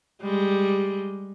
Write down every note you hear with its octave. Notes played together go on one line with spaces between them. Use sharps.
G3 G#3